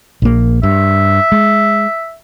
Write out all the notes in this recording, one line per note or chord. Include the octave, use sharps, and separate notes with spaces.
A#1 A#3
G2 E5
G#3